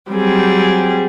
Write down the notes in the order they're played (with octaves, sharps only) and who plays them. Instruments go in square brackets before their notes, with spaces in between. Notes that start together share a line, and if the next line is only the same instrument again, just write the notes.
[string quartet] F#3 G3 C4 G#4